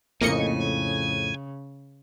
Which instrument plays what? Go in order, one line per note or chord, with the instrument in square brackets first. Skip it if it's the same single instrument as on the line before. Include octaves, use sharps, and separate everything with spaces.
[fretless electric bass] F2 A2 [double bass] C#3 [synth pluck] A#3 D#5 C#7 [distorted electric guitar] G#5